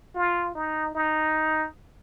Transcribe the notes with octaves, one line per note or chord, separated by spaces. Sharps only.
F4
D#4
D#4